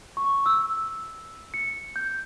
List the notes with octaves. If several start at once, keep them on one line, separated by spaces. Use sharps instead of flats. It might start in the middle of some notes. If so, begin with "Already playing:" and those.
C#6
E6
C#7
G6